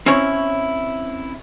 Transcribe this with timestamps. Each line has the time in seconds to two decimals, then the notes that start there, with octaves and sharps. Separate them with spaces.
0.06 C4 C#4 E4 C#5